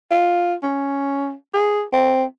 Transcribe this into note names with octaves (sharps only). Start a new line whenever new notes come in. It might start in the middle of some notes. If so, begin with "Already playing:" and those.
F4
C#4
G#4
C4